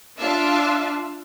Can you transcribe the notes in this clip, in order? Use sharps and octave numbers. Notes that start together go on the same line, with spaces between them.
D4 F4 E5 F5 A5